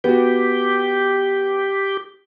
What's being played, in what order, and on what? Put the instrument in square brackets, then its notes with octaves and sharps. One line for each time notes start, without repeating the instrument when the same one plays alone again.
[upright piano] B3 F#4 [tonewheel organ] G4